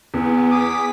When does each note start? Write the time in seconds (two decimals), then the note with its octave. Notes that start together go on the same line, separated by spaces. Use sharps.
0.14 E2 B3
0.51 G#4 D6 D#6 B6